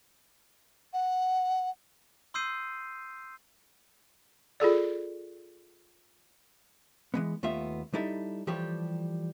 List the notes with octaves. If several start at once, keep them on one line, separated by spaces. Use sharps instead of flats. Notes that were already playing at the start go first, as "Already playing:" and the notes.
F#5
C6 D#6 E6 G6 C7 D#7
F4 G#4 A4 D5
E3 G#3 B3
D#2 A3 B3 F4 E5
G3 D#4 E4 A4
E3 F3 G3 G4 A4 C#5